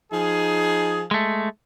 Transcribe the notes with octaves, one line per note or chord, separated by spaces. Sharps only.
F3 D#4 G#4
G#3 A3